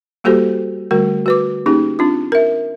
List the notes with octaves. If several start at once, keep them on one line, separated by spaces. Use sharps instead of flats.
G3 A#3 F#4 G4 A4 C5
D3 G3 A3 F#4 A#4
F#4 B4 D6
A#3 C#4 D#4 G4 G#4
C4 D4 F4
A#4 E5